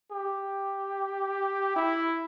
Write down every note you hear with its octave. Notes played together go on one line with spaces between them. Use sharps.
G4
E4